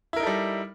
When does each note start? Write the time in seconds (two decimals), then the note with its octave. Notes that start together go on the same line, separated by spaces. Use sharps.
0.13 E4
0.16 A#4
0.20 D#4
0.23 A4
0.27 G3